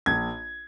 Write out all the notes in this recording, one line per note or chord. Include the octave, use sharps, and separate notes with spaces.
A#1 G#6